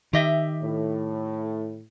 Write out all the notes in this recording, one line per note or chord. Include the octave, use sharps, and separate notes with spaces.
D#3 G4 D#5 E5
A2